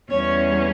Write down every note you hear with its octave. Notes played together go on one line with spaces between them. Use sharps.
E2 G3 C#4 C#5